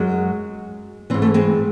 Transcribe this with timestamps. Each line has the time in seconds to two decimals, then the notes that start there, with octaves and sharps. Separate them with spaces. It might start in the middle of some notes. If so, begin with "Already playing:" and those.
Already playing: F#2 F#3 G#3
1.10 G#2 E3 C4
1.22 A3
1.34 G#3 C4